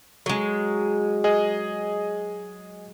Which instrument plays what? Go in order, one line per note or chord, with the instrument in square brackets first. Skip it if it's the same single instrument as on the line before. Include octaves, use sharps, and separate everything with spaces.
[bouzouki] F#3 G#3
[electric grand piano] G#4 D#5